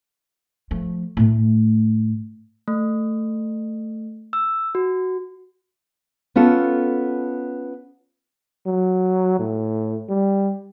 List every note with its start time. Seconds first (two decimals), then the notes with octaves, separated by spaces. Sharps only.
0.71 F3 A3
1.17 A2 A3
2.68 A3
4.33 E6
4.75 F#4
6.36 B3 C#4 F4 A4
8.67 F#3
9.39 A2
10.09 G3